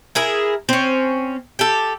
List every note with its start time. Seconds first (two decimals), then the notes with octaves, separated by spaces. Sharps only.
0.15 E4 G#4 A#4
0.69 C4 C#4
1.59 G4 A4